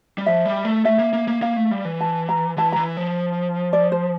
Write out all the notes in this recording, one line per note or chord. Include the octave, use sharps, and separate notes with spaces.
G3
F3 E5
G3
A3
A3 E5
A#3
A#3
A#3
A#3 F5
A3
G3
E3
A5
A#5
E3 A5
E3 A#5
F3
D5
C5